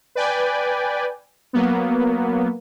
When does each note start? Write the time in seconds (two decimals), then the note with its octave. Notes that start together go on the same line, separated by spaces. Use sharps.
0.15 B4 D5 G5 G#5
1.53 F#3 A#3 B3